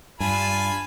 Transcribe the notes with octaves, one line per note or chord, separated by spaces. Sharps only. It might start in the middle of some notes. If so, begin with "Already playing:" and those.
G2 F4 G#5 A5 B5